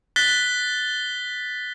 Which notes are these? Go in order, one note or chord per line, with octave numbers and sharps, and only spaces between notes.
F#6 A6 B6 G7